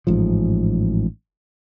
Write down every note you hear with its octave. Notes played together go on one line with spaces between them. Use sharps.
A1 G#2 F3